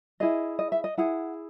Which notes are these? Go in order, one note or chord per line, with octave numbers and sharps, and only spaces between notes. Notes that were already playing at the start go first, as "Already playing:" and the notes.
E4 G#4 D#5
D#5
E5
D#5
E4 G#4 F#5